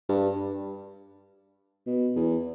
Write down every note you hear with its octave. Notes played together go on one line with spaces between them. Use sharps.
G2
B2
E2